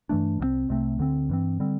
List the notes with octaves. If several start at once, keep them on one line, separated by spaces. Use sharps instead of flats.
G2 E3 A3 D4
C2 C3 E3 C4
C2 C3 A3 C4
D2 D3 C4
G2 E3 C4
D3 G3 C4